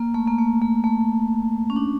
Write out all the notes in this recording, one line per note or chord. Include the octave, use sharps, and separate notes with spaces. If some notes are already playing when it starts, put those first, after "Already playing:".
Already playing: A#3
A3
A#3
A3
A3
A3
C#4
D4